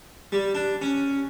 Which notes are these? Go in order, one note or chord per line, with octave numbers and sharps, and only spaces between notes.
G3
D4
C#4